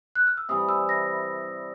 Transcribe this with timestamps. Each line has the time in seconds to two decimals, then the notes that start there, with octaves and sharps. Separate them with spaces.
0.15 F#6
0.27 F6
0.37 E6
0.49 C3 E3 G3 D#6
0.69 E6
0.89 A#6